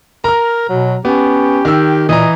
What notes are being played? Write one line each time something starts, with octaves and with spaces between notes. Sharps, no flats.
A#4 A#5 F6
B2 F#3
B3 C#4 G4
D#3 E6
A#2 E3 D#5 A#5